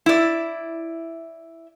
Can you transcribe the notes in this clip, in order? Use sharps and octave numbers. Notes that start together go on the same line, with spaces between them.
E4 D5